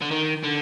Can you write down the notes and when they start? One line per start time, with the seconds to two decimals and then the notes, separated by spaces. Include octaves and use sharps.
0.02 D3
0.11 D#3
0.44 D3